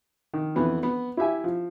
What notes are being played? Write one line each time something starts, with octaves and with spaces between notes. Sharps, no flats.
D#3
F2 E3 B3 F#4
B3
E4 G4 E5 G#5
F3